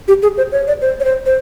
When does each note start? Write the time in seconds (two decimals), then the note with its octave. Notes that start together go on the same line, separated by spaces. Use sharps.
0.08 G4
0.22 G#4
0.37 C5
0.52 C#5
0.67 D5
0.82 C5
1.00 C#5
1.04 C5
1.26 C5